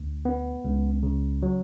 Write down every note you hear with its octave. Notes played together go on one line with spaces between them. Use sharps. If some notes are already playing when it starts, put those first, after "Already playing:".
Already playing: D2
B3
C#2
C#3
F#3